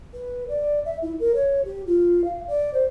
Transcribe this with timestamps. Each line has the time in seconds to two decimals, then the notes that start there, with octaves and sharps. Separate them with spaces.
0.14 B4
0.48 D5
0.85 E5
1.02 E4
1.20 A#4
1.35 C#5
1.65 G4
1.87 F4
2.24 F5
2.48 D5
2.74 C5